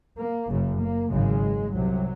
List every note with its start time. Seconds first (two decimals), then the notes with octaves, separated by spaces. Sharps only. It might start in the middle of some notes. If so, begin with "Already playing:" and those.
0.18 A#3
0.49 F#1 F#2 C#3
0.80 A#3
1.11 G#1 F#2 C#3 G#3
1.74 C2 C3 F#3